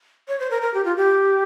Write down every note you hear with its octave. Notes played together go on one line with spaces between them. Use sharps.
C#5
C5
A#4
A#4
G4
F4
G4